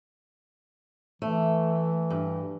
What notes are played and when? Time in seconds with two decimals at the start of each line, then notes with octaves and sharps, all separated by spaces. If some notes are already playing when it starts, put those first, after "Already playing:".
1.22 E3 A3
2.10 G2